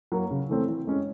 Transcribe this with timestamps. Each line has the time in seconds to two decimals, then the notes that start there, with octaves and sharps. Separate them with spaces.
0.12 F#3 A#3
0.31 C#3
0.49 E3 A3 C4
0.68 E3
0.87 G#3 C#4